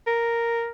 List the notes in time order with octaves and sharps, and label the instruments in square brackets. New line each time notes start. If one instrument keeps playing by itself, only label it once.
[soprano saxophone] A#4